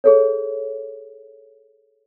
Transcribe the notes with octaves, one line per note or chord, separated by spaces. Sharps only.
G#4 A4 C#5